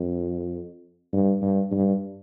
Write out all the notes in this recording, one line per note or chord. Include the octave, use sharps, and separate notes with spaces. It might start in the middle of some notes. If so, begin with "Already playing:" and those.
Already playing: F2
G2
G2
G2